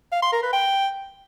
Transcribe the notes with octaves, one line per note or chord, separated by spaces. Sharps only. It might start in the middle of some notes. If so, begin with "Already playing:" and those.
F5
C6
A#4
B4
G5